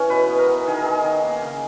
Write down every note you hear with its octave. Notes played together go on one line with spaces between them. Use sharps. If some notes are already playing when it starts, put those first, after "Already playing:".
Already playing: E3 C#4 C#5
B2 B4
B3
A#4
B3
D#3 G#4
A#4
D#3 G#4
D#3
A#3
C#3